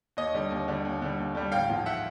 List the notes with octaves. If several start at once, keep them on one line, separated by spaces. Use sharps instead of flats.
D#2 C#5 D#5
D3 G3
D#2
D3 G3
D#2
D3 G3
D#2
D3 G3
A1 F5 G5
G#2 F3
E5 F#5